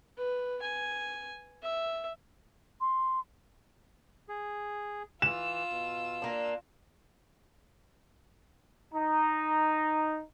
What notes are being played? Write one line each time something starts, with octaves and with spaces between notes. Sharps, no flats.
B4
G#5
E5
C6
G#4
E3 F4 E6 E7
B2
A#3 D4
D#4 A#5